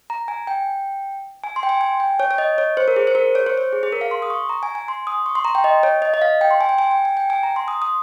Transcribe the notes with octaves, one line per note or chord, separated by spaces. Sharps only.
A#5
G#5
G5
G#5
C6
G5
G#5
G#5
G5
C#5
C#5
D#5
C#5
C5
A#4
G#4
C5
A#4
C#5
C5
C#5
G#4
G#4
A#4
F5
C6
D#6
C#6
A#5
G#5
G#5
C6
D#6
C#6
C6
A#5
G5
D#5
C#5
D#5
D#5
F5
G5
C6
G#5
G5
G#5
G5
G#5
G5
G#5
A#5
C6
D#6
D#6